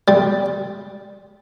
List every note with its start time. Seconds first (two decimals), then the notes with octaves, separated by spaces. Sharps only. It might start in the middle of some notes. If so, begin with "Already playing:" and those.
0.08 G3